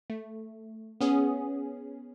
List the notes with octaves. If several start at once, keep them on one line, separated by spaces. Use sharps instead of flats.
A3
B3 C#4 G#4